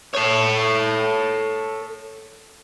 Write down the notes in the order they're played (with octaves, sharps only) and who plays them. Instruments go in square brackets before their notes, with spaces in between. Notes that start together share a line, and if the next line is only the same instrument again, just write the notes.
[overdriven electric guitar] A4 C#5